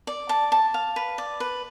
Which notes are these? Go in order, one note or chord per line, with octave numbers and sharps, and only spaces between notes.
D5
A5
A5
F5
B4
D5
B4